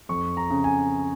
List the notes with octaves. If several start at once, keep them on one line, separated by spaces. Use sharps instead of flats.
F2 C#6
A#5
C#3
G#5